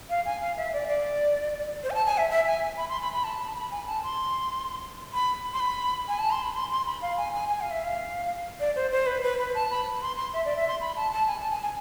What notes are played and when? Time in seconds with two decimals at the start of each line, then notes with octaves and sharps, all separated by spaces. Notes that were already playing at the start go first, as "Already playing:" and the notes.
0.10 F5
0.26 G#5
0.41 F5
0.57 E5
0.73 D5
0.88 D5
1.83 C5
1.90 G#5
1.94 A5
2.06 G#5
2.18 E5
2.30 E5
2.46 G#5
2.77 B5
2.89 C6
3.02 B5
3.13 B5
3.24 A5
3.40 B5
3.48 A5
3.56 B5
3.71 G#5
3.87 A5
4.03 C6
5.13 B5
5.53 C6
5.60 B5
6.08 G#5
6.19 A5
6.31 C6
6.43 B5
6.55 C6
6.71 C6
6.86 B5
7.02 F5
7.18 G#5
7.34 G#5
7.49 G#5
7.61 F5
7.71 E5
7.83 F5
8.60 D5
8.76 C5
8.92 C5
9.06 B4
9.23 B4
9.38 B4
9.54 A5
9.71 B5
10.01 C6
10.17 C6
10.33 E5
10.45 D5
10.57 E5
10.68 C6
10.81 B5
10.96 A5
11.12 A5
11.27 G#5
11.40 A5
11.51 G#5
11.63 G#5